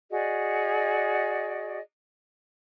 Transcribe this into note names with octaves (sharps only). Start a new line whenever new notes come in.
F#4 G#4 D5 D#5